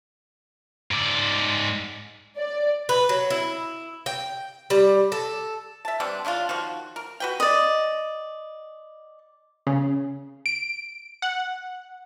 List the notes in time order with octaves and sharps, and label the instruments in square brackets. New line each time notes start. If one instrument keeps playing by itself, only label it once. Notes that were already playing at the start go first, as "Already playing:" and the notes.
[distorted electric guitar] G#2 D5
[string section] D5
[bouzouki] B4
F#3
E4
G5
G3
A4
[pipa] E5 A5
G3 B3 C4 D4
C#3 D4 D#4 F4
D#3 F3 F#4
A#4
F#4 B4 G5
[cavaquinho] D5 D#5
[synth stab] C#3
D7
F#5